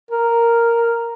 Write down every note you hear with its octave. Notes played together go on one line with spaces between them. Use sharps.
A#4